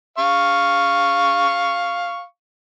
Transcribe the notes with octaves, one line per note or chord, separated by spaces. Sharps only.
F5 C#6